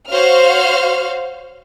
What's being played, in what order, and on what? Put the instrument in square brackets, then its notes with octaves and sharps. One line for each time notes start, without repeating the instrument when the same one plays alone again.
[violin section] F#4 C5 C#5 F5 F6